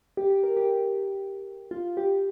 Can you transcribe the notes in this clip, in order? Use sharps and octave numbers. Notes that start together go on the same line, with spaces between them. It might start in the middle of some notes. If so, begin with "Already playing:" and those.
G4
G4
A#4
G4
F4
G4